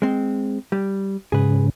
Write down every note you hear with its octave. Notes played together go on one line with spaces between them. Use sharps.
G#3 C4
G3
G#2 C#3 G#4 B4